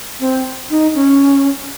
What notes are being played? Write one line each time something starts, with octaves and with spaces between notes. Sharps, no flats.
C4
D#4
C#4